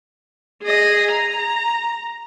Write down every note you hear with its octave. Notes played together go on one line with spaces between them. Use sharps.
G#4 D#5
A#5